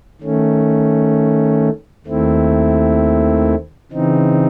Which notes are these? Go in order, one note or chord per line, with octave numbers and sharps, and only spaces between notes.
D#3 A3 C#4
D#2 D#3 A3 C4 E4
C#3 E3 C4 D#4